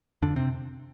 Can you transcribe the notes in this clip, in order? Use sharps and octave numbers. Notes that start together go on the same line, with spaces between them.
F2 D3 D4
C3 C4